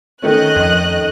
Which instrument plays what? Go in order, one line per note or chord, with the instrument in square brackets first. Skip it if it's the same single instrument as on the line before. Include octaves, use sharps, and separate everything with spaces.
[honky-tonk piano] D#3 A3 C#4 [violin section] D#5 F#6
[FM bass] F2